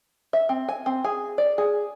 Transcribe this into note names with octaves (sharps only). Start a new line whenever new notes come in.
E5
C4
G#5
C4
G#4
D5
G#4